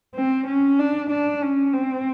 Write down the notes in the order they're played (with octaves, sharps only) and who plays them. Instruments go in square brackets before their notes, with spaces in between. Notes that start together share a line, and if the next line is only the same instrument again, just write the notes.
[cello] C4
C#4
D4
D4
C#4
C4